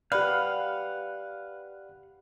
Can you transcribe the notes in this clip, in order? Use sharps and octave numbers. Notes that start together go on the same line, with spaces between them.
G4 B4 D5 F5 F#5